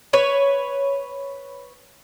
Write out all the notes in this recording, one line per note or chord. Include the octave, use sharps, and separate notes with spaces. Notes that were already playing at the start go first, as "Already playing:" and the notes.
B4 C#5